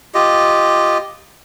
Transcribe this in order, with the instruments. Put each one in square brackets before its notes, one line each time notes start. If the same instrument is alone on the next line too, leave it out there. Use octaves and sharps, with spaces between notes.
[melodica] F4 G4 D#5